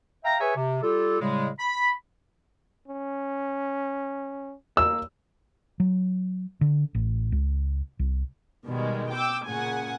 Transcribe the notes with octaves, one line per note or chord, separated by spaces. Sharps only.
E5 F5 G5 A#5
G#4 B4 C#5 E5 G#5
C3
G3 F4 G4 A4
A2 C#3 G3 G#3
B5
C#4
A#3 E6
F#3
D3
A1
C#2
C2
B2 D#3 G3 G#3
G5 D6 E6
A#2 C#3 F#5 G#5